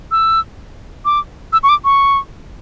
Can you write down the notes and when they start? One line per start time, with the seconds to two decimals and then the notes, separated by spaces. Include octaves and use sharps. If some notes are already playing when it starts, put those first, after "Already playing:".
0.11 E6
1.05 D6
1.53 E6
1.63 C#6
1.69 D6
1.85 C#6